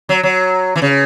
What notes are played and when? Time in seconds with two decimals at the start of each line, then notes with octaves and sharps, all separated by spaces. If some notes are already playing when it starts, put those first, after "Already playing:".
0.09 F#3
0.23 F#3
0.76 E3
0.82 C#3